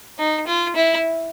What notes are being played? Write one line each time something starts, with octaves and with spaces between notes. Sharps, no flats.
D#4
F4
E4